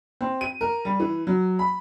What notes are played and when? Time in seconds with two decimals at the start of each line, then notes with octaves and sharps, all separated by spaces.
0.21 C4
0.41 D#7
0.61 A#4
0.85 G3
1.00 E3
1.27 F#3
1.59 B5